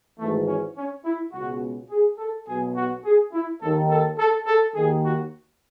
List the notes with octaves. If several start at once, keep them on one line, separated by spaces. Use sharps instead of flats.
G#1 G#2 E3 A3
C#4
C#4
E4
C#2 B2 F#4
G#4
A4
B1 B2 G#4
F#4
G#4
E4
D#2 D#3 A4
A4
A4
A4
D#2 D#3 G#4
F#4